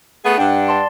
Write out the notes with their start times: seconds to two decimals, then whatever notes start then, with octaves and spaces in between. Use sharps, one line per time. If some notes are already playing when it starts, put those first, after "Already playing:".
0.24 A3 B3 G#4
0.38 G2 D4 F#5 G5
0.68 D5 A5 C6